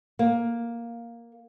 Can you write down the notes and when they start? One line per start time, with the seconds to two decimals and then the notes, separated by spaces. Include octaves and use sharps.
0.19 A#3